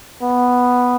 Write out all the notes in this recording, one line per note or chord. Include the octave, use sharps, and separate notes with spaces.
B3